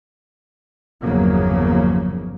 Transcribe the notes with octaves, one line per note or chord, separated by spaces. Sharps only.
G1 E2 C#3 F3 F#3 A#3